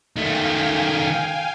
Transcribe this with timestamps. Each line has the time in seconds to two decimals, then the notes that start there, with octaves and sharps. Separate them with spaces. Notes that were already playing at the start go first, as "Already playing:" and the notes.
0.16 D#3 A3 F5 G5 G#5